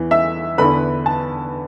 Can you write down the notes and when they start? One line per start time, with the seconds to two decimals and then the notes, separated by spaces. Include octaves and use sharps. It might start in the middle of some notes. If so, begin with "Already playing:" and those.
Already playing: E2 E3
0.11 E5 E6
0.58 E2 D3 B4 B5
1.06 A5